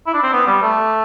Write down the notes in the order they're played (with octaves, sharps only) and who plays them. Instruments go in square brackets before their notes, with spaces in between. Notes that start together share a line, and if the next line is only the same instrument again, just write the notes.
[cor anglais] E4
D4
C4
B3
G3
A3